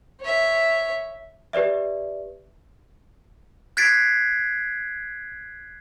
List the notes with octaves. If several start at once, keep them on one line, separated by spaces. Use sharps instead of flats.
C#5 E5
G4 B4 D5 E5
F#6 G#6 A6 B6 C7 D7